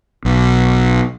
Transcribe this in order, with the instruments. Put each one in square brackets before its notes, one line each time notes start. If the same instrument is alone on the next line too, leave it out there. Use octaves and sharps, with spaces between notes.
[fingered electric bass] B1